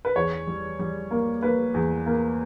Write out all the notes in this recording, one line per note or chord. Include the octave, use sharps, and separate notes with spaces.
B4
E2 C#5
G3
G3
A#3
A#3 B4
E2
A#3